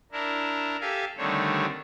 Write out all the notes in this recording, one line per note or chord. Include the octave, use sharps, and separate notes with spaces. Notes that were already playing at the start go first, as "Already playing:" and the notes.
D4 E4 A#4
G4 A4 E5 F5 G#5
D3 D#3 G3 A3 C4 C#5